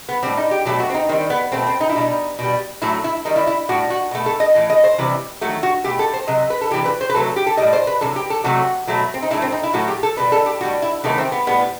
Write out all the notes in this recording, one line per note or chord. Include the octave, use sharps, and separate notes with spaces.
B3
A2 G3 C4
D#4
G4
B2 F#3 A3 G4
F#4
C4
D#4
D#3 G3 C4
B3
B2 A3 C4
C4
D#4
E4
B2 G3 D#4
B2 G3
A2 F#3 A3 E4
E4
D#3 G3 D#4
E4
E4
A2 G3 F#4
F#4
B2 A3
A4
D#5
A2 E3
D#5
C5
C3 E3 G3
D#3 F#3 A3 F#4
F#4
B2 A3 G4
A4
C5
C3 F#3 D#5
B4
A4
C3 E3 G3 G4
B4
C5
B4
C3 F#3 A3 A4
G4
A4
A2 G3 D#5
C5
B4
C3 D#3 F#3 A4
G4
A4
C3 F#3 A3 F#4
B2 F#3 A3
C4
D#4
A2 F#3 A3 E4
C4
D#4
E4
A2 F#3 A3 F#4
G4
A4
B2 G3 B4
A4
G4
A2 G3 F#4
E4
C3 D#3 F#3 A3 B3
C4
B3
A2 G3 B3